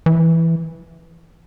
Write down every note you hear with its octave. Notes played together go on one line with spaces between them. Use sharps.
E3